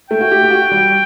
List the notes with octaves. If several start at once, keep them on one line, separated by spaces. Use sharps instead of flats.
A3 G5
F#4
G4
G4
F#4
G3